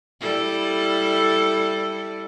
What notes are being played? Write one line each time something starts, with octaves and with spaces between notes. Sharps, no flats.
G3 E4 A4